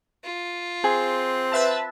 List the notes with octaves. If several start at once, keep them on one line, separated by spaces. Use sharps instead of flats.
F4
C4 G#4
B4 E5 A5